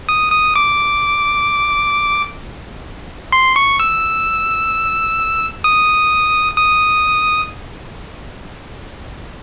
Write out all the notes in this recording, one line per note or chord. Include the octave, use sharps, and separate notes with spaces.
D#6
D#6
D6
C6
C#6
E6
D#6
D#6